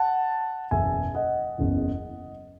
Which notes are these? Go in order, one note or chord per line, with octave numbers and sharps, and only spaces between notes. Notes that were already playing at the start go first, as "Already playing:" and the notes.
Already playing: F#5 A5
F#1 E2 B2 E5 G#5
D#5 F#5
F#1 E2 C#3 E3